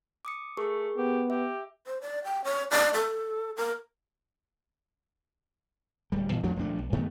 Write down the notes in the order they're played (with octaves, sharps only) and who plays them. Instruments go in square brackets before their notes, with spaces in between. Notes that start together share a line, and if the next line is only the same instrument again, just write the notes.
[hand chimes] D6 D#6 C#7
[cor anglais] A3 [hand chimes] G#4 A#4 C#6
[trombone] B3 [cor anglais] G4
[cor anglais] G4 [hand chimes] E5
[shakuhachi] C5
D5
G5
C#5
D5
A4
A#4
[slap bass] D1 G3
A#2 E3
F2 F3 A3 D4
D#1 F3 A3 D4
B1
G2 D#3 A3 B3